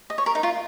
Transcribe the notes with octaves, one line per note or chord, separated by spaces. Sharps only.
D#5
C#5
A#4
D#4
F4